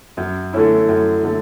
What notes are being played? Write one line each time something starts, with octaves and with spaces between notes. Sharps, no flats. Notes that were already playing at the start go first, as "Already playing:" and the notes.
F#2
D3 A3 C#4 E4
F#2
D3 A3